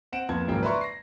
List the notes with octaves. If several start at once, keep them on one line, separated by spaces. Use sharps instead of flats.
C4 F#5 D7 E7
F2 A#2 B3 A5 G#6
G#1 C#3 F3 F#3 A#3 G5
B4 D5 E5 A#5 C6 C#6
A#6 C7